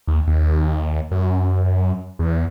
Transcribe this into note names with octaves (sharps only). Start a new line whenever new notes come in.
D#2
D#2
F#2
E2